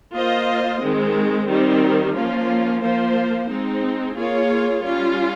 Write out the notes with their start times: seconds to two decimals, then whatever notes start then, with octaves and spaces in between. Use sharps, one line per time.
0.14 A#3 F4 C5 D#5
0.81 D#3 G#3 C4
1.48 D#3 G3 C4 D#4
2.15 F3 A#3 C#4 F4
2.83 F3 A#3 F4 C5
3.50 G#3 C4 D#4
4.16 A#3 F4 G#4 C#5
4.84 G3 C#4 F4